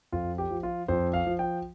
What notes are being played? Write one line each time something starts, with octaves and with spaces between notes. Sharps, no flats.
F2 F4
G4
F3
F4
F2 C5
F5
F3
G5